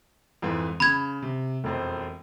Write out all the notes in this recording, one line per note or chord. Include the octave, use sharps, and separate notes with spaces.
F2 G#2 E3
C#3 B5 G#6
C3
E1 F2 C5